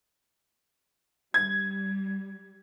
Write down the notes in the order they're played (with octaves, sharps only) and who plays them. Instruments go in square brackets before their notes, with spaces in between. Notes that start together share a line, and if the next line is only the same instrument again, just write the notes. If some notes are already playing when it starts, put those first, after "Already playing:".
[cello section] G3 [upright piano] G#6